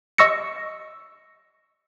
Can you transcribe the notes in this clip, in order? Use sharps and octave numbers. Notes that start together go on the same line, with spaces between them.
D#5 C#6 E6 A#6 C#7